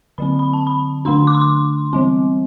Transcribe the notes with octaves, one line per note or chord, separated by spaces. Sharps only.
D3 F#3 C4 B5
B5
A5
B5
D3 A3 D4 C6
D6
C6
D6
E3 G3 C4